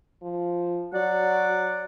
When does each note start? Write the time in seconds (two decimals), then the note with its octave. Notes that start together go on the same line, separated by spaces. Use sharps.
0.23 F3
0.93 F#3 D5 F#5